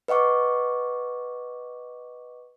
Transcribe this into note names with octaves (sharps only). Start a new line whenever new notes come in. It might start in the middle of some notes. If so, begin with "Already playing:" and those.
B4 D#5 F#5 C#6 D6